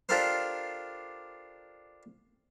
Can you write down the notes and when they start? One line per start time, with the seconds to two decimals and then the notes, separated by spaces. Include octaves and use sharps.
0.09 D4 F4 G4 A4 A#4 C5